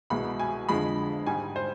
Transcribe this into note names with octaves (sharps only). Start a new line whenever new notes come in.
C2 B2 G#3 B5
G#5
F2 D3 F3 G#3 B5
G#2 G3 G#5
C5